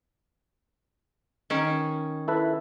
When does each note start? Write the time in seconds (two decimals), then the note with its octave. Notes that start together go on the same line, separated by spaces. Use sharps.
1.50 D#3 C#4
2.28 E4 A4 B4